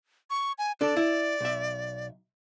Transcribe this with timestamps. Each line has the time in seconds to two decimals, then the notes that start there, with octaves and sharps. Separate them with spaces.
0.30 C#6
0.58 G#5
0.81 D4 A4 D5
0.97 E4
1.41 B1 E5